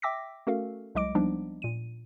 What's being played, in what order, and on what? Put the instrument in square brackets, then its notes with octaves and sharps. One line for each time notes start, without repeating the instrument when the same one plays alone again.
[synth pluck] E5 G5 D6 E6 A#6 B6
A3 C#4 F#4 A4 A#4 F5
C2 F#3 G#3 D#5 D6 D7
F3 G3 A#3 B3 D4 D#4
A#2 D#7